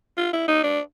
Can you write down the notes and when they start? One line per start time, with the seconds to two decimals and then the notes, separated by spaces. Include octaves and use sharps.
0.17 F4
0.33 E4
0.48 D#4
0.63 D4